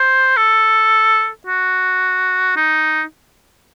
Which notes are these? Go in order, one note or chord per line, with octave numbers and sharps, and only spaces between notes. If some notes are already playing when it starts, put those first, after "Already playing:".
Already playing: C5
A4
F#4
D#4